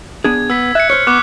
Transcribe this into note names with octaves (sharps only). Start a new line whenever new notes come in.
B3 D4 G#4 G#6
B3 E6 B6
E5 F#6 G#6 C#7
C5 C#5 F6 C#7
B3 C#6 D6 F#6